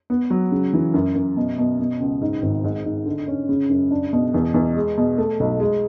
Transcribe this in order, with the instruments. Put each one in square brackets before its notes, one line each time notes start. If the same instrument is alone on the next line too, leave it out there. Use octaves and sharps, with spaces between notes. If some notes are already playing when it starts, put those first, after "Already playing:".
[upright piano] B3
F#3
C#3
E3
F#2
F#2
B2
B2
B2
C#2
G#2
G#1
G#2
G#2
D3
C#4
C#3
F#2
D4
B2
E2
E2
G#3
B2
A3
B1
G#3